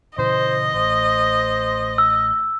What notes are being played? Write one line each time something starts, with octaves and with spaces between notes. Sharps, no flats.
A#2 C#3 E3 C5 D#5
A1 C5
E6